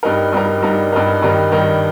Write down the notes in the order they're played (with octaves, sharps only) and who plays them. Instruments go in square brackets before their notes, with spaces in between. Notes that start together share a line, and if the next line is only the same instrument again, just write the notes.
[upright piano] G2 G3 D#4 A#4
G2 G3 D#4 A#4
G2 G3 D#4 A#4
G2 G3 D#4 A#4
G2 D#3 G3 D#4 A#4
G2 D#3 G3 D#4 A#4